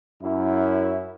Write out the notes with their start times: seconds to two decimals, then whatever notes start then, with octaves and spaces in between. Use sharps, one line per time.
0.22 F#2 E4